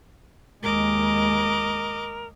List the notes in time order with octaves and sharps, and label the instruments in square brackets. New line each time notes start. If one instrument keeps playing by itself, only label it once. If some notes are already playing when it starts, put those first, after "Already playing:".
[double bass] D#2 G#3 [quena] A#4 [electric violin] D#5 D6